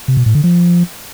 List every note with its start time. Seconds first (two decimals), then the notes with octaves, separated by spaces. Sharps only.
0.08 C3
0.17 B2
0.26 A2
0.35 D3
0.44 F3